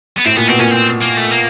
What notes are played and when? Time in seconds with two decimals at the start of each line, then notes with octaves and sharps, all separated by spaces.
0.17 B3
0.24 A2 C4
0.37 A#2 B3
0.47 B2 C4
0.59 A#2 C#4
0.71 C4
1.01 A#3
1.17 A3
1.31 A#3